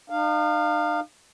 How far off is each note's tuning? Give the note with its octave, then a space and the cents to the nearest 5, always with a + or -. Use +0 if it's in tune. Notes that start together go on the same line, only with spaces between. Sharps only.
D#4 -45 F5 +0